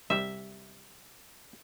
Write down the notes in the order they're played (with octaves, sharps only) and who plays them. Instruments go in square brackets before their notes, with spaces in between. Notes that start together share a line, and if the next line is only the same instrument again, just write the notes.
[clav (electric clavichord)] C2 G3 [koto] E5